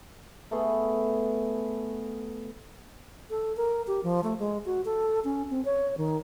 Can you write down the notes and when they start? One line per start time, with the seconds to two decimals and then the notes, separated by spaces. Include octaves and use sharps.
0.51 A3 B3 G#4
3.30 A4
3.57 A#4
3.87 G4
4.03 F3
4.24 A3
4.39 G#3
4.65 F#4
4.85 A4
5.24 C#4
5.50 C4
5.65 C#5
5.97 D#3